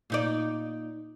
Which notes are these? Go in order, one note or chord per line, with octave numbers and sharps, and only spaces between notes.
A#2 D#4 D5